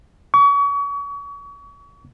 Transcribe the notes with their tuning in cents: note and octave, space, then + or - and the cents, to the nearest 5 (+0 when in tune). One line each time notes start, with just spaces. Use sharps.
C#6 +35